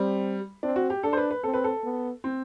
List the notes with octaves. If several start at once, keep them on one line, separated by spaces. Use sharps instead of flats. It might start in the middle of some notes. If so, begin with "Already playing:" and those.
Already playing: G3 C4
C4 D4
F#4
G4
D4 A4
C5
B4
B4
C4 A4
B4
A4
B3
C4